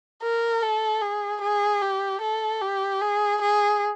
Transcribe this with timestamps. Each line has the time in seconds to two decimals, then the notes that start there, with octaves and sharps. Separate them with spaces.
0.22 A#4
0.62 A4
1.02 G#4
1.41 G#4
1.82 G4
2.21 A4
2.61 G4
3.02 G#4
3.41 G#4